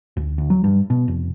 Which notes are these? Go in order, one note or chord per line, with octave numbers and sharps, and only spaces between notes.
D2
D2
F#3
G2
B2
F1